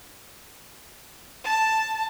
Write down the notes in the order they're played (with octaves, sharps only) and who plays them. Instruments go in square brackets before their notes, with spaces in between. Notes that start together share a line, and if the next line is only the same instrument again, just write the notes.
[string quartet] A5